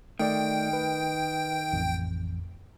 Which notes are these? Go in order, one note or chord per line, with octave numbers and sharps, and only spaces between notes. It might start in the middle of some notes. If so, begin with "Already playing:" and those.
D#3 A3 D5 G5
B4
A1 F2